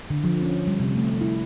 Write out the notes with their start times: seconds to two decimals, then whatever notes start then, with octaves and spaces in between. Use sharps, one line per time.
0.10 D3
0.24 F3
0.43 C#4
0.67 G3
0.80 C3
0.96 A3
1.21 E4